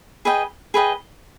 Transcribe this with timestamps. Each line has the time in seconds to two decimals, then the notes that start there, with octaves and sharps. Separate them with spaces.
0.25 G#4 B4 D#5 G5
0.74 G#4 B4 D#5 G5